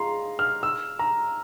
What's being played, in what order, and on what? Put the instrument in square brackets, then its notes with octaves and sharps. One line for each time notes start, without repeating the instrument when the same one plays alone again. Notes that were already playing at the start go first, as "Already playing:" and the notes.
Already playing: [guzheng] F4 G#4 [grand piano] A#5 C6
[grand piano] F6
E6
A#5